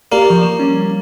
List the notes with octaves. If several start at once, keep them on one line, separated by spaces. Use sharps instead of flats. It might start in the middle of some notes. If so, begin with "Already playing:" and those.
A#3 G4 D5
F3 C#6
E7
G3 C#4